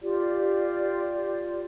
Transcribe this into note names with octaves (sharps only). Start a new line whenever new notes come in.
F4 G4 D5